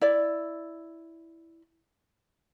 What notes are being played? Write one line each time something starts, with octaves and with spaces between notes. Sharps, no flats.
E4 D5